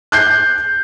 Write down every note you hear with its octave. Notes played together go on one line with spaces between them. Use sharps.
F#6 G6 C7